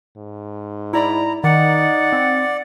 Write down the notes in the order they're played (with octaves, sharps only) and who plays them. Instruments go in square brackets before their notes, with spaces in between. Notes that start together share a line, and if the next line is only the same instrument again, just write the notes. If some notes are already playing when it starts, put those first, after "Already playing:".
[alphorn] G#2
[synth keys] E4 D5 B5 [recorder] A#5
[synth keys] D#3 [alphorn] D#4 [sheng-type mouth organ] D5 [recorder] F#5
[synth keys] C4